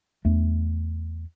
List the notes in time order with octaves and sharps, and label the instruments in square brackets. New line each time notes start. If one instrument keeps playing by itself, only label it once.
[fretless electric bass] E2 A3 D4